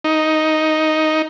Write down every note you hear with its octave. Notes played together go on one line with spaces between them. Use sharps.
D#4